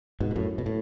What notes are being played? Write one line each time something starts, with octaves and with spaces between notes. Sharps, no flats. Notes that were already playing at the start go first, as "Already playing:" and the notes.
G#2 B2
B2
F#2 A2
B2
A2